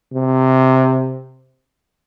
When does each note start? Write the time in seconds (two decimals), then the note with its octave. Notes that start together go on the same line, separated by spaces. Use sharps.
0.14 C3